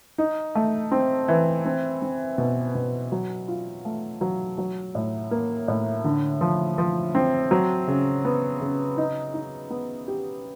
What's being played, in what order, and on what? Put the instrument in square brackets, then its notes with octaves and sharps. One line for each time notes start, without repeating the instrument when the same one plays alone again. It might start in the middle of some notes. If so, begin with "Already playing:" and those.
[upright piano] D#4
A3
C4
E3
C4
C4
B2
B2
F#3
F4
A3
F#3
F#3
A2
A#3
A2
D3
F3
F3
C4
F#3
C#3
B3
C#3
D#4
D#4
B3
G4